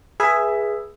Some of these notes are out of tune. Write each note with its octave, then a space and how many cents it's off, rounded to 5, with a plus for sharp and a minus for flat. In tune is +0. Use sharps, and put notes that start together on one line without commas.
G#4 +0 B4 -20 E5 +10